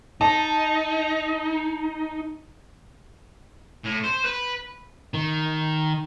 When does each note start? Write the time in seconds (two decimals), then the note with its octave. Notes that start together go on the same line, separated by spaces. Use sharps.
0.21 D#4 A5
3.85 A2
4.04 C5
4.25 B4
5.14 D#3